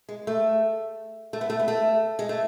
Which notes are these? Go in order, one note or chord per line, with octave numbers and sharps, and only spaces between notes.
G#3
A3
A3
B3
A3
B3
A3
G#3
A3